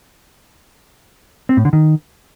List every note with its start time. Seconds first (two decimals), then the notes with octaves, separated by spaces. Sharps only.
1.49 C4
1.57 A2
1.65 D3
1.73 D#3